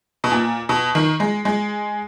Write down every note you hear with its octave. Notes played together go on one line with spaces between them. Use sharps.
B2
A#2
B2
D#3
G#3
G#3